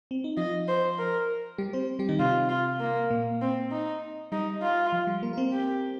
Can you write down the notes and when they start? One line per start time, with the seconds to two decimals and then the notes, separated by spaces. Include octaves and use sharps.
0.11 C4
0.24 D#4
0.37 F3 F4 D#5
0.68 C5
0.98 A#4
1.58 G3 G4
1.73 C4 C5
1.99 G3 G4
2.09 D#3 D#4
2.19 C3 C4 F4
2.49 F4
2.80 A#3
3.10 A#2 A#3
3.41 C4
3.71 D#4
4.32 G3 D#4
4.62 F4
4.92 F3
5.07 G3
5.22 A#3 A#4
5.33 A#4
5.37 C4 C5
5.52 G4